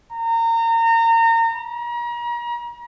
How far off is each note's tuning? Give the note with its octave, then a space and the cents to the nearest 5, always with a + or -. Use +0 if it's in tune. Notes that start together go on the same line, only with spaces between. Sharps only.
A#5 -30
A#5 +40